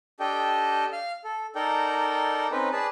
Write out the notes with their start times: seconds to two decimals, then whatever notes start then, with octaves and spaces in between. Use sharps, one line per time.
0.20 D4 G4 A4 D#5 G5
0.93 F5 F6
1.24 A4
1.55 D#4 A4 A#4 D5 G5
2.52 C4 C#4 D#4 B4
2.73 G#4 B4 D5 A5